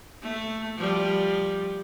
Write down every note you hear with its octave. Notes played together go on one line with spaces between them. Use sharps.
A3
F3 G3